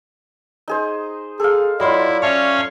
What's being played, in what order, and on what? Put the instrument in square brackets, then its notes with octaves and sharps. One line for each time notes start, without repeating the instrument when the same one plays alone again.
[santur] D#4 G#4 C5
[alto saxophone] G#4 [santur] A4 F5
[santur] F#3 F4 [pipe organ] E4 [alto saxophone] D5 [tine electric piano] D#5 B5 C6
[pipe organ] C#4 C#5 F5 [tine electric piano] E5 A5 C#6